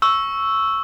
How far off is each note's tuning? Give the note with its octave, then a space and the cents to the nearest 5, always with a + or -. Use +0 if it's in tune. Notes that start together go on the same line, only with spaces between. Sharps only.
C#6 +0 E6 +0